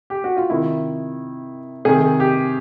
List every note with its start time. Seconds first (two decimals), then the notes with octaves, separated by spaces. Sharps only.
0.10 G4
0.24 F#4
0.37 F4
0.50 C3 D#3 E4
1.85 C3 D#3 G#4
2.20 G4